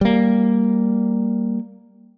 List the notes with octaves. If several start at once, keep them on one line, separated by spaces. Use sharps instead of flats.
G3 A#3